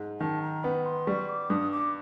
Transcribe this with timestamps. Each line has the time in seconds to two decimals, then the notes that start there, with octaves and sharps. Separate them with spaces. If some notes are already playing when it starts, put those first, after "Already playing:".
Already playing: G#2
0.20 D#3 A5
0.42 A#5
0.64 B3 B5
0.86 C6
1.07 G3 C#6
1.29 D6
1.50 G2 D#6
1.72 D6